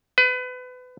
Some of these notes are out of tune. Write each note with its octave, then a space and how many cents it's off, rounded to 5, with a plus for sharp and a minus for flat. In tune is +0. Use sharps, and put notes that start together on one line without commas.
B4 +30